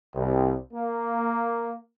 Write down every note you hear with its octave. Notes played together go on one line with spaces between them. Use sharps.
C2
A#3